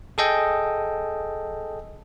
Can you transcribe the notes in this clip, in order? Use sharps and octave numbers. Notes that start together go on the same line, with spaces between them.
G#4 A4 D#5 G5